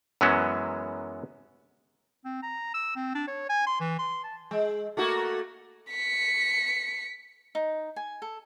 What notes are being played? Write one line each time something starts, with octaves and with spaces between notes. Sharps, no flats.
F#2 E3 F#3 G#3 B3 C#4
C4
A#5
E6
C4
D4
C#5
G#5
C6
E3
C6
A5
G#3
A3 A#3 F#4
B6 C#7
D#4
G#5
A4